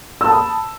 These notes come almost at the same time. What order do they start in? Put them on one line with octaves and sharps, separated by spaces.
E6 A5 B5 D#6